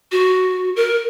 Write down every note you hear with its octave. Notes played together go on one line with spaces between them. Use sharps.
F#4
A#4